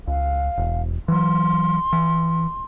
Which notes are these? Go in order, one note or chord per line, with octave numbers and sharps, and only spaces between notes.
C#2 F5
E1
E3 F#3 C6
E3